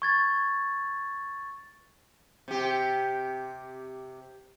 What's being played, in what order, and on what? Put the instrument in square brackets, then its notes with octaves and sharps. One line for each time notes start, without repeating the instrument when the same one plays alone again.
[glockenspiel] C#6 G#6 A6
[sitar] C3 G4